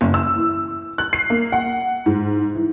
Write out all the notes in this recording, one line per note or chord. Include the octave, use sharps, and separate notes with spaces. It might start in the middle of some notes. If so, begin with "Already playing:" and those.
F#1
E6
E3
F#6
C7
A#3
F#5
G#2
E3